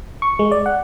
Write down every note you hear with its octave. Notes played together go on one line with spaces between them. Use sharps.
C#6
G#3
D5
F#5